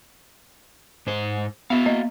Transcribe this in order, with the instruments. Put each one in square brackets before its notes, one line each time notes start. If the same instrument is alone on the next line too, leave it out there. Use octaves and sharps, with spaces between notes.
[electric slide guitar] G#2 C5
[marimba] B3 [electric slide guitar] F#4 E5 F5
[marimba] A#3 D#5